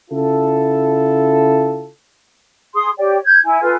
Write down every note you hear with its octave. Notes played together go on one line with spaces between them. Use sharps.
C#3 E4 F4 A4
G#4 C6 D#6
G4 C#5 D5 G5
G6 G#6
E4 G#5
F4 A4 B4 G#5